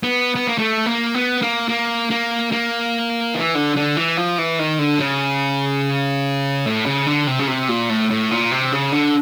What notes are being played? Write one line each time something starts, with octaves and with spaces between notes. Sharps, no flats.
B3
B3
A#3
A3
A#3
B3
A#3
A#3
A#3
A#3
E3
D3
D3
E3
F3
E3
D#3
D3
C#3
A2
C#3
D3
C3
C#3
C3
A#2
A2
A2
A#2
C3
C#3
D3